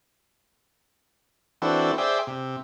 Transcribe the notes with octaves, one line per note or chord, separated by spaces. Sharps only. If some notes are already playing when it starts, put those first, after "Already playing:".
E3 C4 D4 F#4 A4
G#4 C5 D5 E5 G5
C3